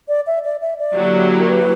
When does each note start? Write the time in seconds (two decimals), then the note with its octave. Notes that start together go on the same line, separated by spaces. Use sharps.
0.08 D5
0.27 E5
0.44 D5
0.62 E5
0.79 D5
0.96 D3 F#3 A#3 E4 G4
1.40 A#4
1.50 B4